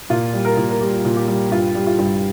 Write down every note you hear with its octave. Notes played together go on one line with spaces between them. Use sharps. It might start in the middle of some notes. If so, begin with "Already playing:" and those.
A#2 F4
G3
A#4
A#2
A#4
G3 G4
A#2
G4
G3
G2 F4
G3
F4
G2